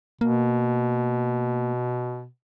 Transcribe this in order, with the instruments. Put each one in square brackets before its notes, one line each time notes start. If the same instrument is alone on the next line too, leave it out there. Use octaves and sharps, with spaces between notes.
[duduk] B2 [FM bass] A#3